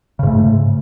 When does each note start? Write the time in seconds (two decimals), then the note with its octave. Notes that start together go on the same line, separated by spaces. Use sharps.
0.19 C#3
0.23 G#2
0.27 A3